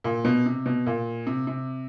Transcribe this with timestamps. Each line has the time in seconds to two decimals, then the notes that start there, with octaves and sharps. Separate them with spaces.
0.04 A#2
0.25 B2
0.46 C3
0.66 B2
0.86 A#2
1.27 C3
1.47 C3